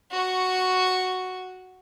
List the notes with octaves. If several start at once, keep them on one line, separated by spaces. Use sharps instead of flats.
F#4 C#6